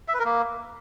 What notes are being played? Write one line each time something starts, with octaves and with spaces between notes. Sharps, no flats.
E5
B4
A#4
A#3